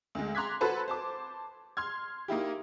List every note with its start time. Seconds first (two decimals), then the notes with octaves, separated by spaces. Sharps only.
0.15 D2 G#3
0.35 A#5 C6 D6 F#6 G#6 B6
0.61 F#4 A4 B4 C5
0.88 C5 A5 D6
1.77 C6 F6 G#6
2.28 A#3 D#4 E4 G4